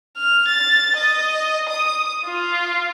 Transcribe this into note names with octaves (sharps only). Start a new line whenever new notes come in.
F6
A6
D#5
D#6
F4